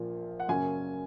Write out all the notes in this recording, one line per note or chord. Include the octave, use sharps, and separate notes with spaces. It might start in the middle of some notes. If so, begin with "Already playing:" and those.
Already playing: A#1 A#2 F3 A#3
F#5
F#2 C#3 F#3 A#3 C#4 G#5